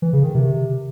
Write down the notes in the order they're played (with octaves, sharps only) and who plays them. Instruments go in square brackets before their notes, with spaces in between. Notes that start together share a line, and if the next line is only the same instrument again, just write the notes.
[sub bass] E3
C#3
D#3
C3